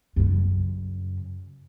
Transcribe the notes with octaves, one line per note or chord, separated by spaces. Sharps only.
F#2 C#3